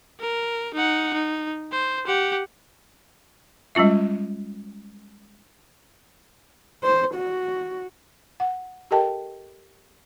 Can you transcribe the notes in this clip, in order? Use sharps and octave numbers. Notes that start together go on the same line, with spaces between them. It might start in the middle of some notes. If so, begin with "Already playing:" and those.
A#4
D#4 F#5
D#4
C5
G4 F#5
G3 G#3 C#4 F4 E5
C5
F#4
F#5
G4 A4 A#4 D#5 G5 A5